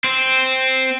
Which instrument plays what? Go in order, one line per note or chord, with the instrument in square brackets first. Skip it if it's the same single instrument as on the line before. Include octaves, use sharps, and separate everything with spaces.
[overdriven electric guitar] C4